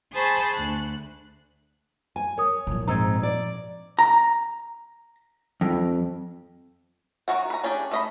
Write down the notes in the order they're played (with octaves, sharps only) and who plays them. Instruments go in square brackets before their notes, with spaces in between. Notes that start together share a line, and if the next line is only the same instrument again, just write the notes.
[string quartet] G#4 C5 G#5 A5 B5 C#6
D2 F#6
[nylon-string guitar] G#5
[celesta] A#4 D#6 [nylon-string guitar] C#5
[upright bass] A#2 F3
[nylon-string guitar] G#2 C4 D#4 [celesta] A#5 E6 G#6
[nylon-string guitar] D5
[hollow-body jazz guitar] A#5
F2
[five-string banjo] D#3 F3 F#4 F#5
B4 A#5
C#4 D4 G4 G#4
A3 D#5 B5